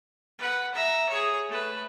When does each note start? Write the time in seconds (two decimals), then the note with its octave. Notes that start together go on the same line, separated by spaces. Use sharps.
0.39 B4 F#5
0.75 E5 A#5
1.09 G#4 C#5
1.48 A3 B4